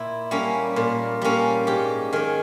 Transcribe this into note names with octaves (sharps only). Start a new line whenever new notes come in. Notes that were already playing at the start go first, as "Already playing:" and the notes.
Already playing: A#2 E4
G3 A#3 C#4
A#2
G3 A#3 C#4
G#2 G4
D#3 G#3 G#4